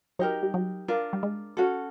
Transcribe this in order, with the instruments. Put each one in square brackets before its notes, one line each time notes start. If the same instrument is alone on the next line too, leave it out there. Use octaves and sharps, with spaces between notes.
[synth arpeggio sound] F#3 [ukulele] D#4 G4 A#4
[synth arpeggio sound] G3
F#3
[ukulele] D4 F4 A#4
[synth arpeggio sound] G3
G#3
[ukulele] C#4 F#4 A4